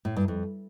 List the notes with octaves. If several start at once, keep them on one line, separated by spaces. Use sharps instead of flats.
A2
G2
F2